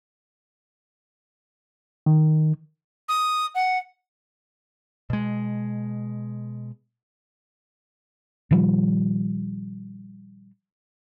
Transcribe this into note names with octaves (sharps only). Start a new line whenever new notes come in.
D#3
D#6
F#5
B2 G#3
A#2 D#3 F3 G3